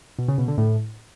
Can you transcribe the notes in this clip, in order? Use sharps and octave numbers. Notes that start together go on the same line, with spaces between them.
B2
C#3
B2
D3
A2